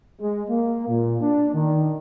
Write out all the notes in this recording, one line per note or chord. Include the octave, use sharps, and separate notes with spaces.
G#3
A#3
A#2
D4
D#3